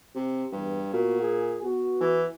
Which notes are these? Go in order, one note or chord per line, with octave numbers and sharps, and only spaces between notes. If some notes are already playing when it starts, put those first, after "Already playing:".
C3
E2 G2
A#2 B3 F#4
G#4
B3 F#4
E3